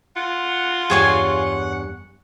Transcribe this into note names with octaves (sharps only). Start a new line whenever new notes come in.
F4 F#5
E2 G2 G4 G#4 C#5 G#5